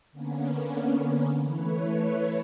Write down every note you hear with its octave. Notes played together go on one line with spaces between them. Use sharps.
D3 A#3 B3 C#4
E3 A3 B4 C#5